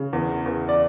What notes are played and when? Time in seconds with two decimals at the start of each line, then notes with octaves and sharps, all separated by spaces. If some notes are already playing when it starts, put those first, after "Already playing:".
Already playing: C#3
0.13 E2
0.46 E2
0.69 D5